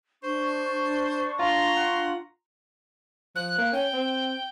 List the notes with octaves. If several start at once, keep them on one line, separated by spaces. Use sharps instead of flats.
D4 C5 C#6
F4 A#5 C6
F#5
F3 F#6
A#3
C#4 G5
C4